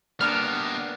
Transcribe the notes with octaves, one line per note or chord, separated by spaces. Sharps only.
G3 A#3 B3 D4 F6